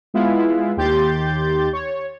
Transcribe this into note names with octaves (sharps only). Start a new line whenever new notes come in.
G#3 B3 E4 F4
D#2 G4 C6 G6 A6
C#5